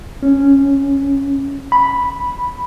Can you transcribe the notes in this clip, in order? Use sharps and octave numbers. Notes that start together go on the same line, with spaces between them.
C#4
B5